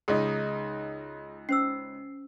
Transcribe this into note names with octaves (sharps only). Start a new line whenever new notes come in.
C#2 D#4 G#4
C#4 C5 E6 C7